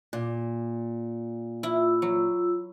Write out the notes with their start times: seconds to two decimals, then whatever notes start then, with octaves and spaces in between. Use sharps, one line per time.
0.13 A#2
1.63 E4 F4 E6
2.02 F#3